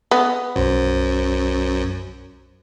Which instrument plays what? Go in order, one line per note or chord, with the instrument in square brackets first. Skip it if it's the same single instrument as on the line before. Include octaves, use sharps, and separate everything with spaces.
[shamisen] B3
[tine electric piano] B1 C5 [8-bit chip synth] F#2